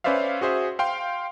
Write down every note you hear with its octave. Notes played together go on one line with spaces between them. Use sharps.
C#4 B4 C5 D5 E5 F5
F#4 G#4 C5 E5
F5 G5 C6